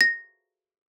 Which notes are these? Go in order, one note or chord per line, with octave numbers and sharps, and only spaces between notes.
A#6